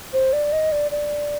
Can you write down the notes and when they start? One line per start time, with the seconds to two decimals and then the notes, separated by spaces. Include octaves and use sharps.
0.13 C5
0.33 D5
0.52 D#5
0.72 D5
0.91 D5